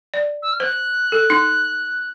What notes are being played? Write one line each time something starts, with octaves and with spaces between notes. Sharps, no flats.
D5
E6
F6
C5 F#6
A4
D#4